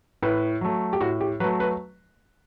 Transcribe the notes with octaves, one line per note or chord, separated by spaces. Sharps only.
A2 B4
F#3 A3
G4
A2 F#4
G4
F#3 A3 B4
B4